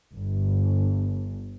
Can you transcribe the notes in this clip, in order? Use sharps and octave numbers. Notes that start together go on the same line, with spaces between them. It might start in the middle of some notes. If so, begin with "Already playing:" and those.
G1